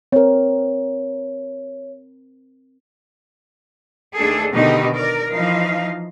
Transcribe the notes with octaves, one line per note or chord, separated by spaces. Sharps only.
C4 A#4 C#5
D#2 A3 D4 G#4 A4
B2 D3 D#3 D#4 G4 D#5
A#4 D5
E3 F3 D#4 F5